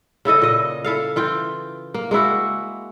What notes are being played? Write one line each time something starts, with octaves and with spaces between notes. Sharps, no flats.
C#3 E4 A4 D#5
A#2 D#5
E4 A4 F5
E3 F4 G5
A#3
G#3 A#3 E4 F#4